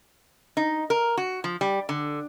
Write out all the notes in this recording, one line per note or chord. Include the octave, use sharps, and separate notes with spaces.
D#4
A#4
F#4
F3
G3
D3